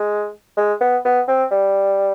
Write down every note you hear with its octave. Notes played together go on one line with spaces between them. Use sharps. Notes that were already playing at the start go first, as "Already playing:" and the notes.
Already playing: G#3
G#3
B3
B3
C4
G3